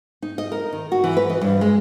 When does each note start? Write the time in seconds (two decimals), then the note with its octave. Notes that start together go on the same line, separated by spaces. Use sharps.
0.22 D#4
0.38 D#5
0.52 A#4
0.73 D#3
0.92 F#4
1.04 E3
1.17 B4
1.30 D#5
1.41 G2
1.61 G#3